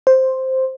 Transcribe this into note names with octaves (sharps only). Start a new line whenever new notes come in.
C5